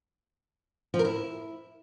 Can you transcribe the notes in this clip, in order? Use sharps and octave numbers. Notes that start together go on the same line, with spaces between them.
F3
A#4
E4